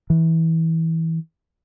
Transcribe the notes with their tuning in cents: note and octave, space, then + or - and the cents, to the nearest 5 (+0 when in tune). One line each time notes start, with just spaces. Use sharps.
E3 -20